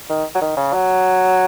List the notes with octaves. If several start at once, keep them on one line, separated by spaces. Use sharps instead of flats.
D#3
F#3
D#3
C#3
F#3